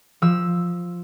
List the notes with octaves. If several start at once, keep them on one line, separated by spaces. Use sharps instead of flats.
F3 E6